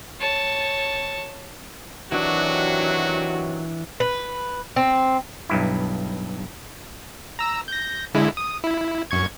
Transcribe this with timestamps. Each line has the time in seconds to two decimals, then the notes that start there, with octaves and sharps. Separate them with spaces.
0.20 C#5 A5
2.12 C3 D#3 E3 F#3 D4 F#4
4.00 B4
4.76 C4
5.49 B1 G2 E4
7.39 A#5 E6
7.68 G6 A#6
8.14 D3 G#3 E4
8.37 D#6
8.64 E4
9.11 F#2 C#6 G#6